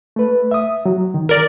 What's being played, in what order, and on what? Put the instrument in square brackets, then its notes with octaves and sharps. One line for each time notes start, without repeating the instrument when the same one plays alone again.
[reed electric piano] A3 B4
E5 D#6
F#3
D#3
[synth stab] A#4 D5